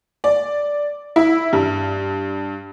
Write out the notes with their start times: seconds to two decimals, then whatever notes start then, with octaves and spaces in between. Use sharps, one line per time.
0.24 D5
1.16 E4
1.53 G2